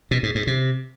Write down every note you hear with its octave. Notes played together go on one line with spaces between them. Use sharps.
B2
G#2
G#2
C3